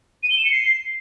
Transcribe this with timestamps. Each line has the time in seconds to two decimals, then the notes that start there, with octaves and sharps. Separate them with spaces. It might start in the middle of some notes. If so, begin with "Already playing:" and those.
0.23 D#7
0.30 G7
0.38 E7
0.45 C#7
0.52 C7